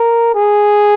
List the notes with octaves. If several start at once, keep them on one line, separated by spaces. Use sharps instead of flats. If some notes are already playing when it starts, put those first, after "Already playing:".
Already playing: A#4
G#4